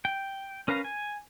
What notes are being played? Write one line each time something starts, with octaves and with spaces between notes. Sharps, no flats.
G5
C#4 A#4 B4 F5 A#5
G#5